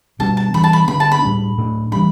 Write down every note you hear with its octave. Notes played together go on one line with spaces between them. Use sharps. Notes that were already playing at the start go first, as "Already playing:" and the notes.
B2 G3 B3 D4 A5
A5
E3 G3 B3 D4 B5
A5
B5
D3 B3 D4 B5
A5
B5
A2 G3 D4
A2 A3 D4
E3 G3 D4 B5